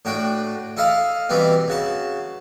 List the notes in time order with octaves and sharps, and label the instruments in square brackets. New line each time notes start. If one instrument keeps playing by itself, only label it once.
[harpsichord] A2 D4 F#4 G5
E4 A4 D#5 F5
B2 E3 G3 B3 C4
C#3 F#4 A5